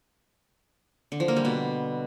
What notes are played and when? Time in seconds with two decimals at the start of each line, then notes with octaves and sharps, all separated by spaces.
1.12 D3
1.20 F3
1.28 A#3
1.36 G3
1.45 B2